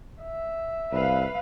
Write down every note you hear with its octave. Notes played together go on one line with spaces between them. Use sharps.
E5
C2 B4 F5